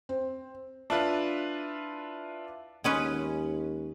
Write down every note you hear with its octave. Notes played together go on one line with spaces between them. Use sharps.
C4
D4 E4 F4 B4
D#2 G#3 C#4 B4